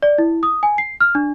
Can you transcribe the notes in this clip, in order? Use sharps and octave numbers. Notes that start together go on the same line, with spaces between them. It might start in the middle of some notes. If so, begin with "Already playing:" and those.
D5
E4
D#6
G#5
C7
F6
D4